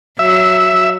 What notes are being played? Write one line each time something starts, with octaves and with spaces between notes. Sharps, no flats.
F#3 E5